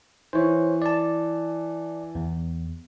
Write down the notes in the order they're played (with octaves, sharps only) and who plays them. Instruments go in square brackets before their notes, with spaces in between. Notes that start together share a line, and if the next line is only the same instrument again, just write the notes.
[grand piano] E3 [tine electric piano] C5 C#5
[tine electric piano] D5 A5
E2